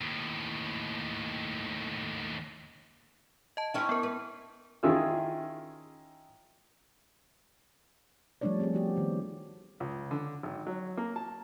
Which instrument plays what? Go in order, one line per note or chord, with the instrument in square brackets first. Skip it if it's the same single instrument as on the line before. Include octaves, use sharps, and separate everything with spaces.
[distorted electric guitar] D#2 A2
[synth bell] D#5 A5
[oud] C4 C#4 E4
[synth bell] B3 A#4
[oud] B4
[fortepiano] D#3 C#4 E4 F4 G#4 E6
[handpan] F3 G3 A3 D4 C#5 D5
C4 G4 G#4
F3 B3 C4 F#4 G4
D#3 B3
[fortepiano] C#2
D3
G#1
F#3
A#3
A5